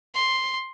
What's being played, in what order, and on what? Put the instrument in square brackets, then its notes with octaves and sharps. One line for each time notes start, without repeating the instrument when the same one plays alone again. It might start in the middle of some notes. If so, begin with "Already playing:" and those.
[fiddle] C6